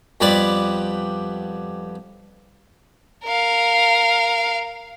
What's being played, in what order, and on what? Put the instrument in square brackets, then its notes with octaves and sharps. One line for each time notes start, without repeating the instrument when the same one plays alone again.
[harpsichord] F2 G3 B3 D5 B5
[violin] A#4 F5